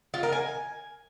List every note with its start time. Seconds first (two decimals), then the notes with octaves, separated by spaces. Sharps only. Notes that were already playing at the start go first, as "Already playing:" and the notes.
0.14 F4
0.23 A#4
0.32 G#5